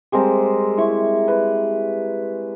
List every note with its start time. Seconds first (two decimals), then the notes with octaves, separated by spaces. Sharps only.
0.12 G3 G#3 C4 A#4
0.78 E4 C#6
1.28 B4